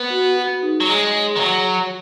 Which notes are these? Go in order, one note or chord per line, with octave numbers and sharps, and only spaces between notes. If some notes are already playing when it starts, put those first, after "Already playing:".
Already playing: B3
F#4 B4
F#4 B4
D#4 G#4
F#3
G#3 G#4 C#5
D#3
F#3